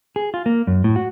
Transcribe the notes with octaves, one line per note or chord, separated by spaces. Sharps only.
G#4
F4
A#3
F#2
A2
F#4